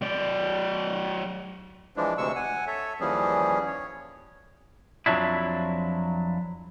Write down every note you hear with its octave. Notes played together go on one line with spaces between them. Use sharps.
F#3 D5
E3 F3 G#3 D4
D2 C3 G#3 C#6 E6
F#5 G#5
A4 C#5 E5
D#2 E3 F3 G3 C#4 G#4
C#5
F2 F3 F#3 D4 E4